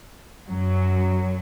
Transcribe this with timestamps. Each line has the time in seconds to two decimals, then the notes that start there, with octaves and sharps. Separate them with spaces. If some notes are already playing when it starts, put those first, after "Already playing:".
0.49 F#2 F#3